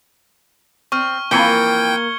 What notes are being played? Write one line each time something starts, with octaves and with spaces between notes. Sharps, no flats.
C4 C#6 F6
E3 F3 A#3 C4 G5 G#6 C#7 G7